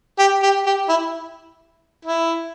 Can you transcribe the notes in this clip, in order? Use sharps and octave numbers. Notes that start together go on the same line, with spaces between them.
G4
G4
G4
E4
E4